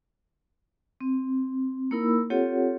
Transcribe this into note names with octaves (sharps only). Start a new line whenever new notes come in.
C4
A#3 D#4 E4 A#4 B5 E6
C4 F4 G4 A4 C#5 F#5